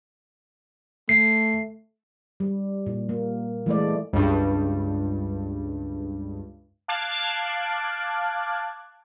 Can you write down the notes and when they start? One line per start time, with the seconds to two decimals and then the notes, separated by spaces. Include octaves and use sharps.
1.09 A3 C7
2.40 G3
2.86 A#2
3.09 A#3
3.66 E3 G#3 A3 D5
4.13 C#2 G2
6.88 F5 A5 D6 F#6 G#6